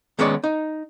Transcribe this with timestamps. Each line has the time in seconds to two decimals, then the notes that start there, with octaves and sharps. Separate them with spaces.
0.19 D#3 G#3 B3 C#4 C#5 D5
0.44 D#4